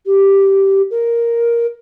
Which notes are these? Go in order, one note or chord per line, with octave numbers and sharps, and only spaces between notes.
G4
A#4